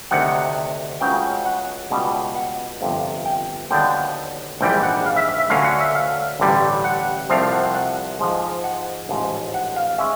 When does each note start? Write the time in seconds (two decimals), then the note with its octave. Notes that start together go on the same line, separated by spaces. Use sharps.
0.11 D2 C3 D#3 F#5
1.01 C#2 C#3 F#3 G5
1.46 F#5
1.90 C#2 B2 G3
2.36 F#5
2.81 G1 F2 C3
3.25 G5
3.70 D#2 D3 F#3 B3 D4 G5
4.61 A#1 G#2 E3 G3 G5
4.83 F#5
5.06 F5
5.16 E5
5.38 E5
5.50 D2 D3 F#3 A#3 C#4 F5
5.64 F#5
5.80 E5
5.95 F5
6.40 A1 G2 D3 G3
6.84 F#5
7.29 C2 C3 F3 A3 C4 F5
7.52 F#5
7.75 F#5
8.19 G#2 F3 G#3
8.64 F#5
9.09 A1 G#2 F3
9.54 F#5
9.76 F5
9.98 G#3 C#4 E5